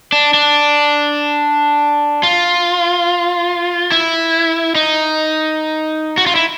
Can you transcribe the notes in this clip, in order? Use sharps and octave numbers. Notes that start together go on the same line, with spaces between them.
D4
D4
F4
E4
D#4
F#4
F4
E4